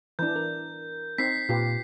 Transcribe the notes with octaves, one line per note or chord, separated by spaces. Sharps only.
E3 D4 G6
A#4
C4 D#4 B6 C7
A#2 F4 G4 B4